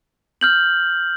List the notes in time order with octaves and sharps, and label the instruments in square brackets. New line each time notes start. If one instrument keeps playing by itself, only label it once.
[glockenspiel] F6 G6 F#7